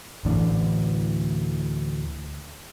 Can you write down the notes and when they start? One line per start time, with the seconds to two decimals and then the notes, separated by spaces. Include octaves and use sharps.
0.25 D2 A2 E3 D4